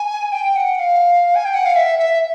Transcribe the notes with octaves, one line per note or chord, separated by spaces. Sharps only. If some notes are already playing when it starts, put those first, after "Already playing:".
Already playing: G#5
G5
F#5
F5
G#5
G5
F#5
F5
E5
E5